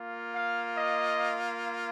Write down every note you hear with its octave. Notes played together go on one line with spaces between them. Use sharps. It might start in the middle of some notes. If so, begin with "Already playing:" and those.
Already playing: A#3 F4
F5
D#5